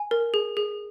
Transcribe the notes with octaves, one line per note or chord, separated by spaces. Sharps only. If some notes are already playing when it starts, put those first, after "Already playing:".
Already playing: G#5
A#4
G#4
G#4